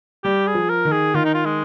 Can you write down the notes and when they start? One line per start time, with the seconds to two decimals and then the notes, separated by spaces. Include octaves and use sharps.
0.24 G3 G4
0.47 G#4
0.54 F3
0.69 A#4
0.85 D#3
0.92 G#4
1.14 D#3 F4
1.25 D#4
1.34 F4
1.45 G#3